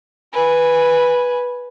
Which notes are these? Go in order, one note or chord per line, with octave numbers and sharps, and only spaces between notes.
B4 G#5